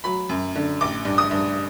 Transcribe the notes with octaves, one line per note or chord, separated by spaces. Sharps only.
F#3 B5
F#2
D3
A1 D6
G2
D#6
G2